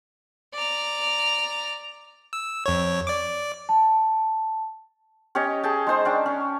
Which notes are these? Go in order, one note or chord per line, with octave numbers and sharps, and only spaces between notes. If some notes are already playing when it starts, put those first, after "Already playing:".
D5 A#5
E6
F2 C#5
D5 D6
A5
C#4 G4 C#5 D#5
G#4 G5 A5
G#3 D#4 C5 A5
C#4 D4 G5
C#4